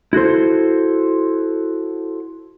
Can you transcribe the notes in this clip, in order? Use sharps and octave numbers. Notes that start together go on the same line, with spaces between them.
E4 F#4 A4 C5